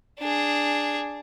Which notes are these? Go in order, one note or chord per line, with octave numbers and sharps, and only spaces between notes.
D4 G#4